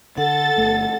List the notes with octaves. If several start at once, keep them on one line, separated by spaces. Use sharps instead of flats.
D3 A4 F#5 A6
G1 A3